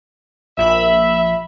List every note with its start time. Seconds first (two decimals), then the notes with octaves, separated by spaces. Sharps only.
0.57 A#1 E5 B5